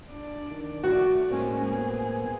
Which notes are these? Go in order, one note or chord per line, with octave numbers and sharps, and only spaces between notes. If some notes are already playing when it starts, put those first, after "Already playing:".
D4 D5
D#3
A3 F#4 D5
A2 G#3 A#3 C4 C#4
B3 G#4